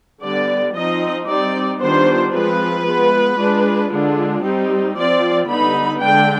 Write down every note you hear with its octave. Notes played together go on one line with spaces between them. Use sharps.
D3 G3 B3 D5
F3 C4 D#4 D#5
G3 C4 D#4 D5
D#3 G3 B3 D4 F4 C5
F3 G#3 C4 F4 B4
G#3 B3 F4
G#3 D4 F4
D3 G#3 D4 F4
G3 C4 D#4 G4
F3 C4 F4 D5
D3 G3 B3 D#4 B5
D3 G#3 D4 G5